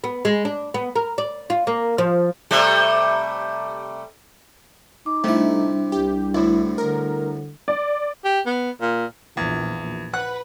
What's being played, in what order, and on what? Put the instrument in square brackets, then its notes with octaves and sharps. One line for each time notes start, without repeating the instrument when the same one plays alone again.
[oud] B3
G#3
D4
B3
A#4
D5
F4
A#3
F3
[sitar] C3 G3 A3
[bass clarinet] D#4 [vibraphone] D6
[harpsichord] C3 E4 [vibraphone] G3 D4 [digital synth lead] A3
[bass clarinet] C2 [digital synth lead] G4
[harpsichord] D2 A2 [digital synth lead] E4
[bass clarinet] D3 [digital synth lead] A#4
[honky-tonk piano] D5
[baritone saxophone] G4
B3
A#2
[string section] A#1 [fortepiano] E2
[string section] B4 [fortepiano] F#5 F#6